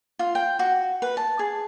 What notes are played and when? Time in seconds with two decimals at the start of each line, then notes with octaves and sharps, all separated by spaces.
0.19 F4
0.35 G5
0.59 F#4
1.02 B4
1.17 A5
1.39 G#4